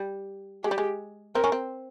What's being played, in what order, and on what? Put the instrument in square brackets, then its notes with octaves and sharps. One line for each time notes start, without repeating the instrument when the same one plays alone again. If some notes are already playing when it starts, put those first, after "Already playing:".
Already playing: [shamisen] G3
[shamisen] G#3 [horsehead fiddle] G4
[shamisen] G3
G#3
[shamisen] C4 [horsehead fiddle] A#4
[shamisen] C#4
C4